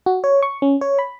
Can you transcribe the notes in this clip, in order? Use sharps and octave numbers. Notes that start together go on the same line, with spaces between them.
F#4
C#5
C#6
C#4
C#5
B5